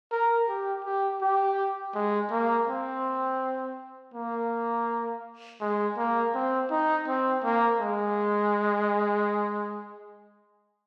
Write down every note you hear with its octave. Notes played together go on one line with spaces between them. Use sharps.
A#4
G4
G4
G4
G#3
A#3
C4
A#3
G#3
A#3
C4
D#4
C4
A#3
G#3